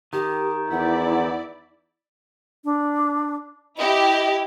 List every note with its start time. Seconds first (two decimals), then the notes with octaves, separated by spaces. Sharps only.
0.13 D#3 G4
0.71 E2 E4 D5 F#5
2.65 D4
3.78 E4 G4 D#5